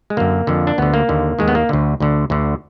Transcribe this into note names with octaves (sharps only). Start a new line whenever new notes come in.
G#3
F#2 D3 A#3
F2 D3
D4
D2 D3 B3
A#3
D#2 D3
D#2 D#3 G#3
B3
A#3
D2 D3
D2 D3
D2 D3